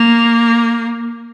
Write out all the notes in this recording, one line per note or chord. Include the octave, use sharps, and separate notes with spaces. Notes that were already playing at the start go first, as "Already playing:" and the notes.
Already playing: A#3